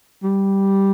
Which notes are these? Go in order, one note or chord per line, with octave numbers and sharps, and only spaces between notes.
G3